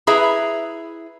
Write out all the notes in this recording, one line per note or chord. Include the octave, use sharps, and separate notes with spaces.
E4 G#4 B4 E5 A#5